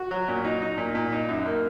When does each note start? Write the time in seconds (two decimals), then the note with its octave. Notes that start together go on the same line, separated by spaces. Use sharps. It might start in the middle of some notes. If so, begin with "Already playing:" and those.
Already playing: F#4
0.11 F#3
0.28 A#2
0.45 D#4
0.62 D#4
0.78 A#2
0.95 A#2
1.12 D#4
1.29 F#2
1.46 A#3